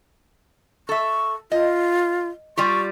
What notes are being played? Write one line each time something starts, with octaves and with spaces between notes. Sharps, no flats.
A4 E5 C#6
F4 D#5
G3 F4 G4 C#6